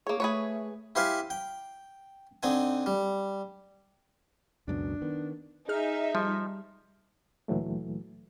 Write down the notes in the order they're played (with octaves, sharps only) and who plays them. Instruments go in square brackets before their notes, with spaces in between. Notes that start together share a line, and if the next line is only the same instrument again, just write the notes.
[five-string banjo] A#3 C#5 [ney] G#4
[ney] A3 [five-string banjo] G#4 B4 C#5
[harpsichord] E4 G4 C5 F5 G#5
G5
D3 C4 D#4 G#5
G3
[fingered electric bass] C#2 F#2 B2 [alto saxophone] D4
[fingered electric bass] D#3 B3
[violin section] D#4 E5 [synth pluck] G#4 F6
[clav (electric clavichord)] F3 [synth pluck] G3
[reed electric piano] D2 A#2 E3 F#3 A3